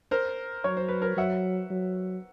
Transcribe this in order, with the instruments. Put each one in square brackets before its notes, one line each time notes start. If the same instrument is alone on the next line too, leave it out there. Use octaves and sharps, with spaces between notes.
[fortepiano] A#4 C5
[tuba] F#3 [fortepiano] C#5
[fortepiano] C5
B4
A#4 C5
[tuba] F#3 [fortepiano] E5 F#5
[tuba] F#3